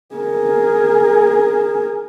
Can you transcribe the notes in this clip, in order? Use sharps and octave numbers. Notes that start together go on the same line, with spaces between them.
G#4 A#4